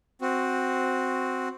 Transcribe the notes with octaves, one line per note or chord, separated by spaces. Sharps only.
C4 F#4